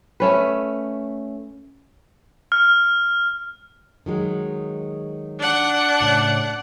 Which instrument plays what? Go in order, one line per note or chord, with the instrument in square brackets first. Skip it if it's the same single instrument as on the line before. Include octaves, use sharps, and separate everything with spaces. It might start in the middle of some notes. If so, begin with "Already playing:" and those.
[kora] A3 C#4 B4
[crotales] F6
[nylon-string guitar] D#3 F#3 G#3
[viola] D4 F#5
[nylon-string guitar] A2 C#3